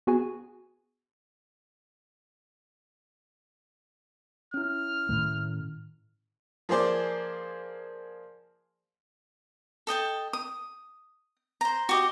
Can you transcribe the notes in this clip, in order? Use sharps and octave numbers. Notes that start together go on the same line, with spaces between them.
B3 F#4 G#4 G#5
C#4 E4 F6
A2 D#3 A3
F3 A#3 G#4 C5 D5
A4 D#5 G5 A5
D#6
C5 A#5
F#4 G4 D#5